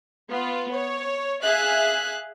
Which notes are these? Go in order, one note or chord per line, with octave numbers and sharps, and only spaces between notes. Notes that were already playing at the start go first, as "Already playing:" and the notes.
B3 F4
C#5
G#4 E5 F5 F#6